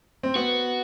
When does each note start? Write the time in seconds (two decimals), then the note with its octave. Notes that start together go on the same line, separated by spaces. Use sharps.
0.23 C4
0.35 B3 F#4